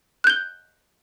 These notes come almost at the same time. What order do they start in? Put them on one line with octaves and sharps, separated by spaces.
F#6 G6 G7